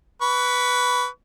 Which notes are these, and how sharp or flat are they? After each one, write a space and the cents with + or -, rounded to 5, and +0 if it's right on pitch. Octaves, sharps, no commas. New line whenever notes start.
B4 +0 C#6 +30